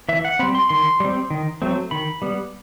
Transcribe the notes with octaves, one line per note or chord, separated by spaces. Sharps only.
E3 E5
F#5
G3 C4 B5
C6
D#3 C6
G3 C4
D#3
F#3 A3 C4
D#3 B5
G3 B3